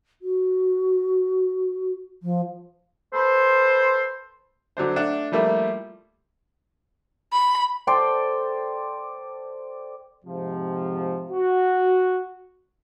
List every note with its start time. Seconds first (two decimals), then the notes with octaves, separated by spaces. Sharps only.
0.22 F#4
2.22 F3
3.14 A4 B4 C5
4.77 D3 F#3 D4 C5
4.96 A3 D4 F#5
5.32 F3 G3 A3 A#3 E4
7.32 B5
7.87 A4 C5 D5 G5
10.25 G#2 C3 F3
11.31 F#4